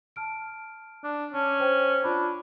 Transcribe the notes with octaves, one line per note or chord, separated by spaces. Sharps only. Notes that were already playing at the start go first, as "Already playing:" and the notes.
A5 F6 D7
D4
C#4 A5
C5 G5
D4 F4 B5